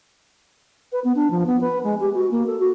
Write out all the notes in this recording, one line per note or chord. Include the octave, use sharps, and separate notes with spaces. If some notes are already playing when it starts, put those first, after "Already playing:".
B4
B3
D4
F3
B3
B4
G#3
G4
F#4
A#3
A4
F#4